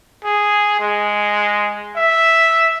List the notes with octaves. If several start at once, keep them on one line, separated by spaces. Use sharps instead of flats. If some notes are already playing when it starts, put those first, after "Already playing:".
G#4
G#3
E5